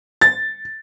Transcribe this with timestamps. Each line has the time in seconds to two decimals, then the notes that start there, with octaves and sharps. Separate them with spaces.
0.21 A6